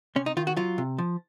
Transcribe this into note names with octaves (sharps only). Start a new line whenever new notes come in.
C3 C#4
D#4
D#3 F4
F#4
F#3 F4
C3
F3